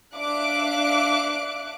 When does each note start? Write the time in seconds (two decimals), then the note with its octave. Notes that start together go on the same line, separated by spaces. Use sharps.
0.15 D4 E5 F5 D6 F#6 D7